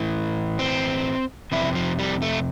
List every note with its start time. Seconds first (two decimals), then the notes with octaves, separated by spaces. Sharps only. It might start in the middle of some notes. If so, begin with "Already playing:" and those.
Already playing: A2 E3
0.59 C4
1.52 F2 C3 E3 E4
1.75 F3
1.99 G3
2.22 A3